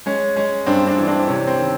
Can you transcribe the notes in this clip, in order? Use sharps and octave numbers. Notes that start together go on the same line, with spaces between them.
G#3 C#4
G#3 C#4
G2 C4 D4
C4 D4
E3
C4 D4
C3 C#4
C4
D#3